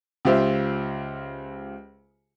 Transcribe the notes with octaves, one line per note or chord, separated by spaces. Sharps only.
C#2 F4 G4 C5 E5